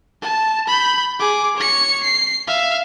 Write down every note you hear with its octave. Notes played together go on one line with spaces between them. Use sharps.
A5
B5 G6
G#4 D6
C#5 C#7
C7
E5 F5